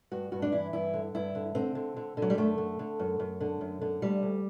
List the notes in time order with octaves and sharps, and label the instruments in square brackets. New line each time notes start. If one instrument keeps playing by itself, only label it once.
[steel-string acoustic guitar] G2 F#4
G2 F#4
D4
E3 E4
G2 E4
D3
G2 E4
D3
D3 C4
D3
D3
D3
F#3
G3
F#2 A3
D3
D3
F#2
F#2
D3
F#2
D3
D2 G3
D2